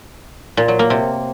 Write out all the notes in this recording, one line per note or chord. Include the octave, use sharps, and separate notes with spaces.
A#2
F#3
A#3
C3